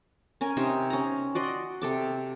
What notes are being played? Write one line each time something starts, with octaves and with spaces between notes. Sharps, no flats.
C#4 A#4 G#5
C3 D#4 C5
C#4 A#5
F#4 D5 D#5 C6
C3 A4 D6